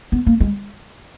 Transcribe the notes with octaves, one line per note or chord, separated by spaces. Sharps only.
B3
A#3
G#3